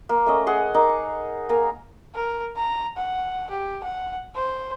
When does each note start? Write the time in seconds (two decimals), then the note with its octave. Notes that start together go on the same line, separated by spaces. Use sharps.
0.09 A#3
0.26 A3 C#4 D#5
0.46 G#4 F#5 C6
0.74 D#4 A#4 D6
0.89 C#6
1.49 A#3 A#4 G#5 A#5
2.15 A#4
2.56 A#5
2.97 F#5
3.50 G4
3.83 F#5
4.35 C5